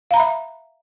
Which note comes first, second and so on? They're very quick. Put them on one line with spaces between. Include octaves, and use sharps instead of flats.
F5 A#5 B5 E5